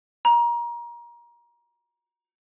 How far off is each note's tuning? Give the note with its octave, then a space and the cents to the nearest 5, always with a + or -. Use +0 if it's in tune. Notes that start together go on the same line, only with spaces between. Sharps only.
A#5 +25